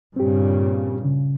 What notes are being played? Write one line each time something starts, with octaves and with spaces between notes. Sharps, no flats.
G2 A#2 C#3 C4 G4
C#3